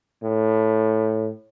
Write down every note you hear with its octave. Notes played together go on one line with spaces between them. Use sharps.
A2